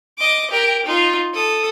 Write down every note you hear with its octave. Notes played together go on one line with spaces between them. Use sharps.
D#5 D6
G4 A#4
D#4 F4
A4 D#6